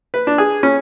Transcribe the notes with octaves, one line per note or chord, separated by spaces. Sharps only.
B4
D4
G#4
C#4